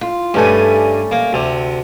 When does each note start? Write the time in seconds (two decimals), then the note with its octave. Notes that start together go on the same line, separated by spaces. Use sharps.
0.01 F4
0.34 G2 G3 A3 C#4 G#5
1.11 A#3
1.33 D2 C3